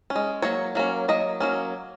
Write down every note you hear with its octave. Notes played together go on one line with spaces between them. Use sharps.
C#4
G#3
F#3 A#3 C#5
F#3 A#3 C#4
F#3 A#3 D#5
F#3 A#3 C#4